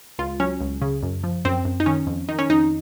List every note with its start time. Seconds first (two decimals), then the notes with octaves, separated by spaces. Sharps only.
0.19 C#2 F4
0.40 F#3 C#4
0.61 C#2
0.82 C#3
1.03 F#2
1.24 F3
1.45 F#2 C4
1.65 F#2
1.80 D#4
1.86 D#3 C#4
2.07 F2
2.29 D#3 D#4
2.39 C#4
2.49 F2 D#4